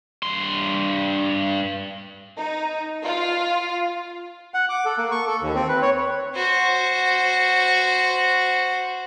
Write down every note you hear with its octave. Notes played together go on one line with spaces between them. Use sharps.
G2 C6
D#4
F4
F#5
D6
A4
A#3
C#6
A4
D#2
C4
B4
C#5
F#4 C5